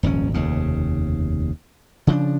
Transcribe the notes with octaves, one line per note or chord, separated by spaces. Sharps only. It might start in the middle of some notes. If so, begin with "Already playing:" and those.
D#1 G#1 F2 C#4
F1 D#2 C#3
C#3 F3 C#4 D4